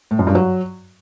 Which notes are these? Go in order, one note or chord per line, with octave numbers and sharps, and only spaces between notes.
A2
F#2
G2
F#3